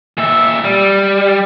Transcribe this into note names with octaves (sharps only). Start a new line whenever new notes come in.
A#2 E5
G3